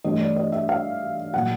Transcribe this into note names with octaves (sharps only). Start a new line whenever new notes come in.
G2 E3 A3 D#5
D5
D#5
E5
F5
A#2 F#3 F#5